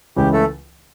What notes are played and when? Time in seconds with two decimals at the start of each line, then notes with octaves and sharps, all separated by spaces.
0.16 C#2 C#3 E3 G4
0.33 A3 A4